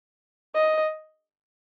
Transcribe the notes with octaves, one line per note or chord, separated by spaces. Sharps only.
D#5